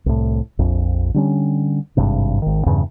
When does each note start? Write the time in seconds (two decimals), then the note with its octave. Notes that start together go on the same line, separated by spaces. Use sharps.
0.06 C2 A2
0.59 A#1 F2
1.14 D3 G3 C#4
1.97 G#1 G2 C3
2.42 G#1 D#3
2.66 E2 G2 C#3 E3